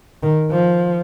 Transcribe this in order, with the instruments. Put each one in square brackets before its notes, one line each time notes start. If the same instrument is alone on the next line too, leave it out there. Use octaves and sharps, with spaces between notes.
[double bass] D#3
F3